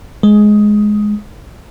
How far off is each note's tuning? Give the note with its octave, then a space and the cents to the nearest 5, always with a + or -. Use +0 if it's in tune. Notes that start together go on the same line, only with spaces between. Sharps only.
G#3 +10